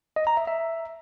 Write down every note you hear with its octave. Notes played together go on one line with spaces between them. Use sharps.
D#5
A#5
E5
E5